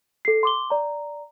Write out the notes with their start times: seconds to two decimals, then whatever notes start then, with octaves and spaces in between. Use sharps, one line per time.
0.25 A4 C7
0.43 C6 D6 G7
0.70 D5 A#5